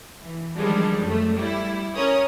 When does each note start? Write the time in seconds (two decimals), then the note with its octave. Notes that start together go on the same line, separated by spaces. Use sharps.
0.22 E3
0.56 D#3 F3 G3 G#3 D4
1.02 F#2 A3
1.36 G3 E4
1.95 C#4 A#4 C#5 D#6